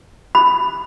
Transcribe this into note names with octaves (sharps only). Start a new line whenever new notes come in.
B5